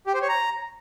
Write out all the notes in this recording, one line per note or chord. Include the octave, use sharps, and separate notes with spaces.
G4
C5
C#5
A#5